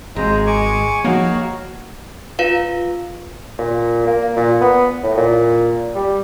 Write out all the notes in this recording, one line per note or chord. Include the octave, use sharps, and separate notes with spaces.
G#1 G#3 C5 A#5
G#5 C#6 D6
F3 A#3 D#4 F#4 C#5 F5
F4 B4 F5
A#2
A#3
A#2
B3
A2
A#2
G3